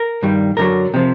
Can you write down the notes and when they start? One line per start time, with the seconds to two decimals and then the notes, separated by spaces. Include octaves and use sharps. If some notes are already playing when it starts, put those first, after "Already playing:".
Already playing: A#4
0.22 G2 D#3 G3
0.57 F#2 D3 F#3 A#4
0.94 C3 F3